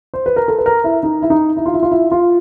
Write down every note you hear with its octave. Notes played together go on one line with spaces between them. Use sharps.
C5
B4
A#4
A4
B4
A#4
E4
D#4
E4
D#4
E4
F4
E4
F4
E4
F4